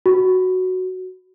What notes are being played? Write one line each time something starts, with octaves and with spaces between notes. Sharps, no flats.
F#4